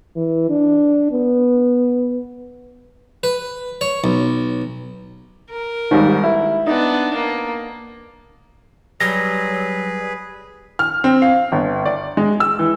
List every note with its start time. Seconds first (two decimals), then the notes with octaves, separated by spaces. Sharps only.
0.16 E3
0.50 D4
1.11 B3
3.23 B4
3.81 C#5
4.04 B1
5.50 A#4
5.91 D#2 G#2 G3
6.24 E4
6.67 B3 D4 D#4
7.14 A#3
9.00 F#3 G3 G#4 B4 A#6
10.79 F6
11.04 C4
11.22 F5
11.52 G1
11.85 D5
12.17 G#3
12.40 E6
12.59 E3